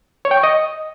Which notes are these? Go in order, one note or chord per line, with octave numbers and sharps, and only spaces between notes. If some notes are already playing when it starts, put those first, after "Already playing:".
C#5
G5
C#6
D#5